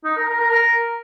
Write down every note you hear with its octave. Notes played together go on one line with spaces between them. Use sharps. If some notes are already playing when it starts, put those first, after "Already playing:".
D#4
A#4
A#4
A#4
A#4